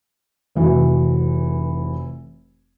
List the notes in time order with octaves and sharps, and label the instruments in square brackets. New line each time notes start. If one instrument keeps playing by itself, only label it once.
[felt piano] F1 E3 F#4